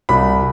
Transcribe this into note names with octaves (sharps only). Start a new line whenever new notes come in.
C2 B5